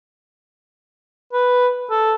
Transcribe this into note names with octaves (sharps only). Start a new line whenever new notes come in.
B4
A4